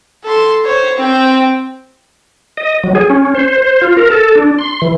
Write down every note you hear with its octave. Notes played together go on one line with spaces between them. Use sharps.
A4 C6
C5 C#5
C4 G5
D#5
F#3
G#4
C#4
C5
C5
F4
A#4
A4
D4
C6
E3